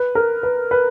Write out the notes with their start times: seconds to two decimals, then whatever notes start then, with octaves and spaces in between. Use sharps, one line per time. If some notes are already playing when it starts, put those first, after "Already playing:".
Already playing: B4
0.15 A#4
0.43 B4
0.71 B4